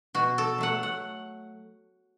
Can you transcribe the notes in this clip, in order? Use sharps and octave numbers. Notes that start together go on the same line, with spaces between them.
B2 F#4
A4
F#3 A3 F#5
F#5